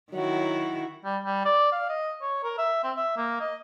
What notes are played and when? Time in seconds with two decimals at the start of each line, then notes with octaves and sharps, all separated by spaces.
0.13 D#3 F#3 E4 F#4
1.05 G3
1.25 G3
1.46 D5
1.72 F5
1.90 D#5
2.22 C#5
2.44 A#4
2.58 E5
2.84 C4
2.97 E5
3.17 A#3
3.41 D#5